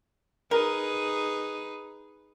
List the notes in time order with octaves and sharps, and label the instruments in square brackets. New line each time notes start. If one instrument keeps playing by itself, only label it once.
[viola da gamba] D#4 G#4 B4 [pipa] A#4